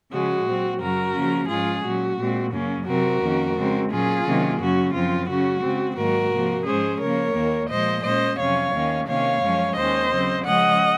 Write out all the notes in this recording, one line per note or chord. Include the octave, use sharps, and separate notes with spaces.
C#3 F3 G#3 C#4 F#4
A#2 F#3 C4
F#2 C#3 F#3 F#4 A#4
C#3 F3 A#3 C#4
G#2 F3 G#3 C#4 F4 G#4
A#2 F#3 C#4 F#4
A#2 G#3 C4
F#2 C#3 F#3 A#3 C#4
C3 F#3 C4 F#4 A#4
F2 D#3 A#3 C#4
C#3 G#3 C4
A#2 F#3 A#3 C#4 F4 G#4
C3 D#3 F#3 A#3 C#4
F#2 C#3 F#3 C#4 F#4
F#2 F3 C4 F4
C#3 F#3 C#4 F#4
C#3 G#3 C4
G#2 D#3 F#3 A#3 F#4 A#4
C3 F3 A#3
G#2 F3 G#3 C#4 G#4 C5
C#3 F3 A#3 A#4 C#5
D#2 D#3 A#3
A#2 F3 G#3 C5 D#5
A#2 G#3 C#4 C5 D#5
F2 C3 F#3 C#4 C#5 F5
D#2 D#3 A#3 C#4
C3 D#3 A#3 C#4 C#5 F5
F#2 F3 G#3 C#4
D#2 D#3 G#3 C#4 C5 D#5
C#3 F#3 C4
C#3 F3 G#3 C#4 D#5 F#5